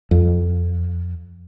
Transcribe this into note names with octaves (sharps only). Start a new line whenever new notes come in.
F2